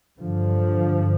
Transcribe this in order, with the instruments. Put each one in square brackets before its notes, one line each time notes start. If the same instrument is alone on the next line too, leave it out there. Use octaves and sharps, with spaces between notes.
[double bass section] G2 D3 F3